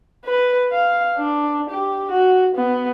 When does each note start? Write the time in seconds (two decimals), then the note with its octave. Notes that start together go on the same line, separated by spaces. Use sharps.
0.25 B4
0.73 F5
1.17 D4
1.70 G4
2.11 F#4
2.55 B3